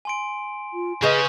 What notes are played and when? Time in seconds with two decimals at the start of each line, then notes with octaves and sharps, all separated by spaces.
0.05 G#5 C6 D7
0.74 F4
1.02 C#3 C#4 G#4 B4 D#5 C#6 D#6 G6